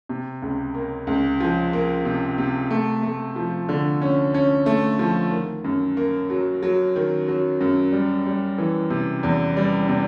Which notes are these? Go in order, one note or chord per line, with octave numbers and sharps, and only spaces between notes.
C3
C#2
A#3
C#2
F3
A#3
C3
C3
A3
A3
F3
D3
C#4
C#4
A3
F3
D#3
F#2
A#3
F#3
F#3
D#3
F#3
F#2
G3
G3
E3
C3
E2
G3
C3